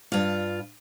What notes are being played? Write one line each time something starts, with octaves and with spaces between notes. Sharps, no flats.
G2 F4